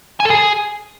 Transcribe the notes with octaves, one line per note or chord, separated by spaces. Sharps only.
G#5
A4
G#4